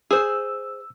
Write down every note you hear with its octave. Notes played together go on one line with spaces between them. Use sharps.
G#4 C5 E6